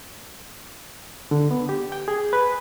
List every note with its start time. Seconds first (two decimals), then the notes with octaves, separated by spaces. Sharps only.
1.31 D3
1.51 B3
1.69 G4
1.92 G5
2.08 G#4
2.33 B4